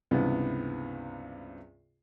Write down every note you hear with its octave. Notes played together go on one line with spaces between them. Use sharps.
C#2 G2 C3 E3 B3